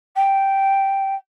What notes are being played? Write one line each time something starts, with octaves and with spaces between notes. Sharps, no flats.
G5